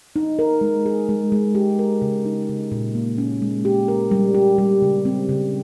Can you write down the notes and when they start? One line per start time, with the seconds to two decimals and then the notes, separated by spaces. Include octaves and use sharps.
0.16 D#4
0.39 A#4
0.61 G#3
0.86 G#4
1.09 G#3
1.32 G#3
1.55 G4
1.79 A#4
2.02 C#3
2.25 D#4
2.49 C#3
2.71 A#2
2.95 A#3
3.18 C#4
3.42 G#3
3.65 G4
3.88 A#4
4.11 G3
4.34 G4
4.58 G3
4.82 C#3
5.05 C4
5.29 C#3